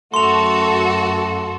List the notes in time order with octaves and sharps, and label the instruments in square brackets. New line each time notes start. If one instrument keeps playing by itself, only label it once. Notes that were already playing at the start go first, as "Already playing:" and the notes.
[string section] F#2 F#4 A4 [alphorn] A3 [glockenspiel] C6 F7